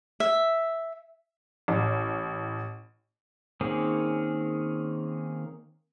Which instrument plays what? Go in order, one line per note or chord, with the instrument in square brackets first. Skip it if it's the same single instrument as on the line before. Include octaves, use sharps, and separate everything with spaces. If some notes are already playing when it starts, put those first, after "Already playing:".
[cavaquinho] E5
[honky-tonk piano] A1
[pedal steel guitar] D#3 A#3 C4 C#4 G#4